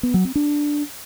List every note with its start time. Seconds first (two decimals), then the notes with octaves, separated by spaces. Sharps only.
0.03 B3
0.14 F#3
0.25 C4
0.35 D4